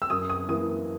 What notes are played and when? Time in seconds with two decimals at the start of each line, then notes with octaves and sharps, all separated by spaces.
0.02 E6
0.10 F#2 D#6
0.29 D#6
0.48 E3 A#3 D#6